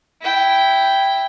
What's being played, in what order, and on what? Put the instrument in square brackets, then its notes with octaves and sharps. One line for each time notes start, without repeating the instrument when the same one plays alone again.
[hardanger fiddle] E4 G5